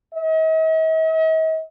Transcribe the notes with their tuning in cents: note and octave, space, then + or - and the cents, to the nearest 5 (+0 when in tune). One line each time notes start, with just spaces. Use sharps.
D#5 +45